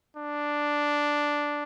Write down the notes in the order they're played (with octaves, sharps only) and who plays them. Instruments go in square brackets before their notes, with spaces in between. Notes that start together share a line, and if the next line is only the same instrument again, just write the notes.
[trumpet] D4